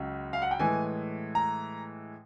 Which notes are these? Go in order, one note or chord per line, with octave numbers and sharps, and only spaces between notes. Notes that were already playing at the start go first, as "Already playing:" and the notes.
Already playing: C#2 C#3 F#3
F5
F#5
G5
A2 E3 G#3 G#5
A#5